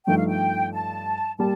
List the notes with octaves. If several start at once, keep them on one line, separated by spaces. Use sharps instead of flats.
G2 F3 A3 D#4 G5
F5
G5
A5
G3 A#3 A5